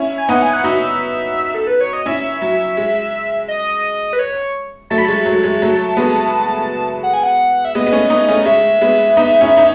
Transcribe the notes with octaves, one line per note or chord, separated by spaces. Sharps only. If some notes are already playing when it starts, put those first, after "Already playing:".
Already playing: C#4 E4
G#5
B3 D#4 F#5
G#5
F#5
D#4 F#4 E5
A4
B4
C#5
D#5
C#4 E4 E5
F#3
G#3
D#5
B4
C#5
F#3 A3 A5
B5
G#3 A5
F#3
G#3
F#3 A3
G#3 B3
F#5
G#5
F#5
E5
G#3 B3 D#5
B3
A3 C#4
B3 D#4
A3 C#4
G#3 E5
G#3 B3
B3 D#4
C#4 E4
D#4